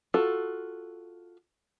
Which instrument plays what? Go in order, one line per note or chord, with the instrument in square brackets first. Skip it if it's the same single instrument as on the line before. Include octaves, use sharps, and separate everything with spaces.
[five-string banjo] F4 F#4 A4